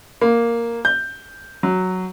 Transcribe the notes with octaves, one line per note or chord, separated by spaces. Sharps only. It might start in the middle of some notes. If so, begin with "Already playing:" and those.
A#3
G6
F#3